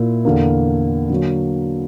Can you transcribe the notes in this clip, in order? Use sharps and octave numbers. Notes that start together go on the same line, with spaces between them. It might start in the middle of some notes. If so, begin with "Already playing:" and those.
Already playing: A#2 A#3 E4
E2 D3 A#3
D3 F#3 A#3